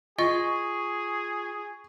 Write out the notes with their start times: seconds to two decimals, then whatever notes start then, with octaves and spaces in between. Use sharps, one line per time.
0.19 F4 G#4 D#5 C#6